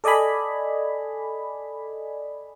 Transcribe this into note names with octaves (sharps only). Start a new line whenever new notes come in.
A4 D5 D#5 G#5 B5